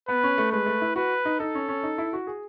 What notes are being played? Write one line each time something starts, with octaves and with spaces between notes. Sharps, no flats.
B3 B4
C#4
A3
G#3 B4
A3
E4
F#4 B4
D#4
D#4 A4
C#4
C#4
D#4
E4
F#4
G#4